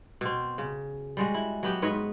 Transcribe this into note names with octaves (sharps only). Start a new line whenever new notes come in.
B2 C4
C#3
G3 G#3 F#4
E4
F#3 B3 G4
G#2 B4 C#5 D#5